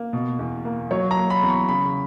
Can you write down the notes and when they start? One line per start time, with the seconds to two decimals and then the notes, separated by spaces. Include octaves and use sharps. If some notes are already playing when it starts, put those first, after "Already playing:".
Already playing: A#3
0.13 B2
0.39 E2
0.65 A#3
0.91 F#3 C#5
1.11 A#5
1.17 A#3
1.30 B5
1.43 E2
1.49 C#6
1.69 C#3 B5